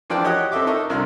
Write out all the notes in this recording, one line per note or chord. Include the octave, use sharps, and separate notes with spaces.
E3 F3 D4 A#4 D5 G5
G4 C#5 D#5 F#5 D#6 F#6
C4 A4 D#5 E5 D6
D#4 A4 A#4 D#5 C#6
C2 C3 D4 E4 F6